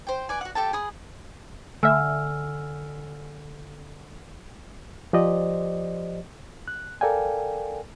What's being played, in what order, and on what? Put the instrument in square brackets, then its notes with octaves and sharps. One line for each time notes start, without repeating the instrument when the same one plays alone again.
[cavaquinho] C5 G5
B4 D5 G#5
F#4 F#5
G4 A4 G5 A5
G#4 B5 D#6
[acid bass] D3 [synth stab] A3 E5 [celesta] G#5 E6 F6
[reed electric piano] F3 G4 C5 D5 D#5
F#6
A4 A#4 D5 F5 G5 G#5